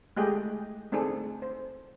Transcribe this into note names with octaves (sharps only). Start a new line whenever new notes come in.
G#3 A3 G4 G#4 D#5 G5
A3 C4 D4 D#4 G#4 A4
C5